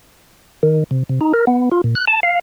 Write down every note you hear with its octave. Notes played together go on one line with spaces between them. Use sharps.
D#3
C3
C3
D#4
A#4
B3
F4
A#2
F#6
A5
F5